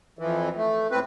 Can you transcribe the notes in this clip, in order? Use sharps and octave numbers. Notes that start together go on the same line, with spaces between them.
F2 E3
A3
A2 C4 B4